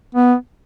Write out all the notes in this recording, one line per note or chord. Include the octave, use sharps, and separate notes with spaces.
B3